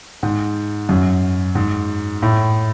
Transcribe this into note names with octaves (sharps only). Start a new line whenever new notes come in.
G#2
F#2
G#2
A2